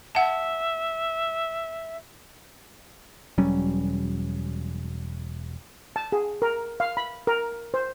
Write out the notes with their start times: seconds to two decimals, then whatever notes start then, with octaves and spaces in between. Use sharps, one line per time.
0.15 E5 F#5 A5
3.38 E1 F#3 G3 C#4
5.96 A5
6.12 G#4
6.42 A#4
6.80 F5
6.97 B5
7.27 A#4
7.74 C5